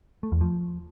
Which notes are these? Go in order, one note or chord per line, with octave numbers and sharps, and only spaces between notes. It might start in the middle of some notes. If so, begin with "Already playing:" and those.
A3
E2
F3